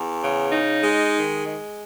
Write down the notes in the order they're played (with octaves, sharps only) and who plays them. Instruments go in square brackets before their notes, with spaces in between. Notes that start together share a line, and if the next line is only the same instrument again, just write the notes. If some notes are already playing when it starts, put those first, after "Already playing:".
Already playing: [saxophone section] E2
C#3
D#4
G#3
D#3
G#3